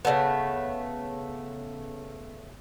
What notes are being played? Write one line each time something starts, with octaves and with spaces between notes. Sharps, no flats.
C#3 G#3 A3 B3